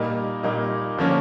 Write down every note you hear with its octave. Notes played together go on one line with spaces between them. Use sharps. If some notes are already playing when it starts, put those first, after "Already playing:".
Already playing: A#2 G3 A#3 D#4
A#2 G3 A#3 D#4
D3 F3 A#3 C#4